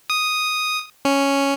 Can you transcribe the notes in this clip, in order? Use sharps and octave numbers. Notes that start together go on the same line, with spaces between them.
D#6
C#4